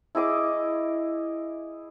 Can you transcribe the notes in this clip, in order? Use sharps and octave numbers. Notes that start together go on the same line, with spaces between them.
E4 G#4 D#5 D6